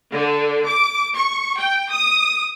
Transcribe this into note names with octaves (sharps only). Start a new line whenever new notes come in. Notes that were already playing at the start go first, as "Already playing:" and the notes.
D3
D6
C#6
G5
D#6